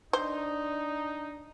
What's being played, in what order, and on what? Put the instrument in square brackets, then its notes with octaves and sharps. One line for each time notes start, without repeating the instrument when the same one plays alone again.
[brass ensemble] D4 D#4 [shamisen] C5